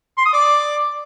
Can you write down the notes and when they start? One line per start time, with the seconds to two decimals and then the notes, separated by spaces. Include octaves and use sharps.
0.18 C6
0.25 D#6
0.33 D5